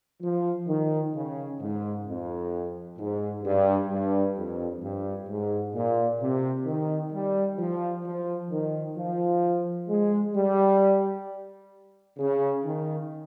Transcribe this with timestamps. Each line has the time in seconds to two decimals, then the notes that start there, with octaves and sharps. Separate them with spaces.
0.22 F3
0.68 D#3
1.14 C#3
1.60 G#2
2.06 F2
2.98 G#2
3.44 G2
3.90 G2
4.36 F2
4.81 G2
5.28 G#2
5.74 A#2
6.20 C3
6.66 D#3
7.12 G3
7.58 F3
8.04 F3
8.50 D#3
8.96 F3
9.88 G#3
10.34 G3
12.18 C#3
12.64 D#3